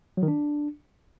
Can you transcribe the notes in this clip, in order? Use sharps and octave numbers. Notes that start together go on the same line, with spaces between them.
F#3
D#3
D4